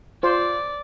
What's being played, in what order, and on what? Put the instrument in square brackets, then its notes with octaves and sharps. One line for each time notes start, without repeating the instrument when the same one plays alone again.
[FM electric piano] F4 [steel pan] C5 [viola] D5